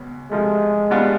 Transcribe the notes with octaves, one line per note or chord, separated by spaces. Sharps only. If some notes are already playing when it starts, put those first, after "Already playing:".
Already playing: C#2 B2
C3 F3 G#3 A3
B2 G3 B3 D4 F4